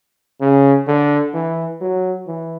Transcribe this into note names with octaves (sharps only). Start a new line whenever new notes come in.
C#3
D3
E3
F#3
E3